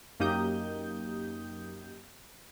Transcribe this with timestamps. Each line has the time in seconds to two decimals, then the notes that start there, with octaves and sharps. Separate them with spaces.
0.20 F#2 A#3 D#4 G4 D#6 G6